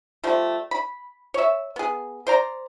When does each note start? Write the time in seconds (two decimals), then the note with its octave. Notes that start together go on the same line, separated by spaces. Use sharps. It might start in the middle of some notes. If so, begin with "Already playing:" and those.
0.24 F3 G3 A3
0.71 B5
1.34 C#5 E5
1.76 B3 G#4
2.27 C5 D5 A#5